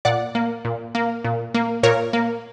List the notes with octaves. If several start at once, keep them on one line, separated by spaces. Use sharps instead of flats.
A#2 D5 F#5
A#3
A#2
A#3
A#2
A#3
A#2 A#4 C#5
A#3